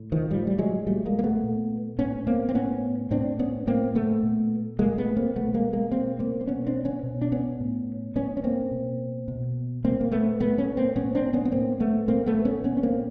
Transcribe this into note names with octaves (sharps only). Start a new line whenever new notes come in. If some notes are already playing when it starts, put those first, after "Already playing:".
Already playing: A2
D#3 F3
A2 F3 G3
G3
F#3 G#3
A#2 G3 A3
G#3 A#3
A#3
A3 B3
A#2
A2 B3 C#4
A#3 C4
C4
A2 B3 C#4
A2 C4 D4
B3 C#4
A2 A#3 C4
A3 B3
A#2
A#2 G#3 A#3
A3 B3
A#3 C4
B2 A3 B3
G#3 A#3
G#3 A#3
B2 A#3 C4
A#3 C4
C4
B2 B3 C#4
C4 D4
B3 C#4
B2
D4
B3 C#4
A2
A2 B3 C#4
C#4
A#3 C4
B2
B2
A#2 A#3 C4
A#3
A3 B3
A#2 A3 B3
B3 C#4
A#3 C4
A2 B3 C#4
C4 D4
B3 C#4
B3
A2 A#3 C4
A3 B3
A#2 A#3 C4
A3 B3
B3 C#4
A#2 B3 C#4
C#4
A#3 C4